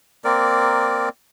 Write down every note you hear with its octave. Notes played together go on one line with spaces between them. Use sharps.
A#3 C4 A#4 D5